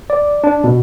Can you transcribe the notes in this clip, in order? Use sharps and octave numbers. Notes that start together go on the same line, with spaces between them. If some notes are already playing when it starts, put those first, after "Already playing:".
D5
D4
B2